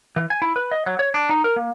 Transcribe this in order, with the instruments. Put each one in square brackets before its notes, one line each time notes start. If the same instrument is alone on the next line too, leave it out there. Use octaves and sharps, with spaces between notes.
[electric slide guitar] E3
G#5
E4
B4
D#5
F#3
C#5
D4
D#4
A#4
A#3